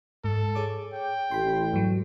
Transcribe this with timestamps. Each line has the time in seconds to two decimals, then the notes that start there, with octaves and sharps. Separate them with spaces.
0.24 G#2 A4
0.55 G#4 C#5 D6
0.93 G5
1.31 A1 B5 C6
1.73 G#2 F#3